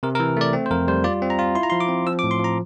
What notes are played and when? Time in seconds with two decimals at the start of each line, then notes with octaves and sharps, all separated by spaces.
0.03 C3 A#4
0.15 A#4
0.20 E3
0.37 A3 D5
0.53 C4
0.66 C5
0.71 F2 A#4
0.88 G3 C5
1.04 F4 D5
1.22 C4
1.30 A#5
1.39 F4
1.55 E4 C6
1.63 A#5
1.70 F3 C6
1.80 D6
1.89 C4
2.06 F3 E6
2.19 D6
2.24 A2
2.31 C6
2.39 F3 A#5